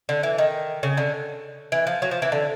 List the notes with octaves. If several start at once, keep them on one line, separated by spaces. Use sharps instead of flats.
D3
E3
D#3
C#3
D3
E3
F3
F#3
F3
E3
D3